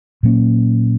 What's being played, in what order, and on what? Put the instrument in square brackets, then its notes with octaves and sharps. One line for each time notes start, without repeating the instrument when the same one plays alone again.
[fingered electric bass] A#2 F#3 A#3 C#4